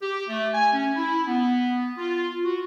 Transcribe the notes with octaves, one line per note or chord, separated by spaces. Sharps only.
G4
A3
G#5
C#4
E4
B3
F4
F#4